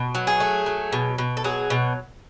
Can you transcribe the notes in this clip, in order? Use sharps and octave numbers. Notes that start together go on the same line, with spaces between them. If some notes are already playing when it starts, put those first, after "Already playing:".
Already playing: B2
F#3
G#4
A3
F#3
B2
B2
A4
F#3 G#4
B2